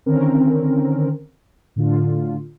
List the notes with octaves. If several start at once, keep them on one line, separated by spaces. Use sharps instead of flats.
D3 D#3 C4 C#4 A#4
A2 D3 F4